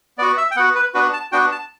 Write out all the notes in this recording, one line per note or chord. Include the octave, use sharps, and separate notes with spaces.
B3 F#4 D5
E5
G5
B3 F#4 F#5
B4
B3 D4 F#4 B4
A5
B3 D4 F#4 G5
A5